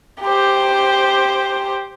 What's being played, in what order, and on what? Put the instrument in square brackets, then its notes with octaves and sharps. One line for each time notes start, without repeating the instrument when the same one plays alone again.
[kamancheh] G4 C5